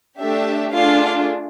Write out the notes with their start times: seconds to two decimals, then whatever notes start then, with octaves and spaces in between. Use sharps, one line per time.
0.19 A3 D4 G4 E5
0.72 A3 D4 F4 G#4 F5